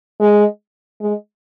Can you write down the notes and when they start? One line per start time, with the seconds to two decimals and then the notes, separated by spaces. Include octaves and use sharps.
0.20 G#3
1.01 G#3